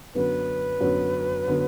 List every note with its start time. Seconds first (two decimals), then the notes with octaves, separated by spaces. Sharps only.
0.15 F#2 D3 F#3 B3 B4
0.81 F#2 D3 F#3 B3
1.47 D3 F#3 B3